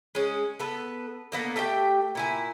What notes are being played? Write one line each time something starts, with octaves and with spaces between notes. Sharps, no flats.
G#3 C#4
B3 A4 B4
D3 A#3 B3
A3 G4 E5 G5
A#2 E4 G#5